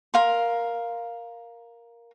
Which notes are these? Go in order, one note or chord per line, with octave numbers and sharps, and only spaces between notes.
A#4 F5 C6